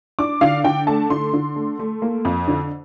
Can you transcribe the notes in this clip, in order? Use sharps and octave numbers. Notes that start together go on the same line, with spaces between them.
D4 D6
D3 F5
D3 G5
A3 A5
D3 C6
D3
A3
A3
A#3
F2
D3